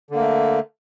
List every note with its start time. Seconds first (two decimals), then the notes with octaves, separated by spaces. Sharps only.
0.11 D3
0.15 A#3
0.20 A3